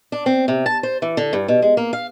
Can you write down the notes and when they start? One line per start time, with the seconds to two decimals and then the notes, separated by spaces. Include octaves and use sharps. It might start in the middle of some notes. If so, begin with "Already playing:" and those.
0.12 D4
0.26 C4
0.48 C3
0.66 A5
0.83 C5
1.02 E3
1.17 D3
1.33 G2
1.48 B2
1.62 G#3
1.77 A#3
1.93 F5